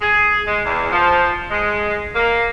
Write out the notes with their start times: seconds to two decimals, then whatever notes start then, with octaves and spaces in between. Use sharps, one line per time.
0.01 G#4
0.46 G#3
0.65 E2
0.91 F3
1.51 G#3
2.15 A#3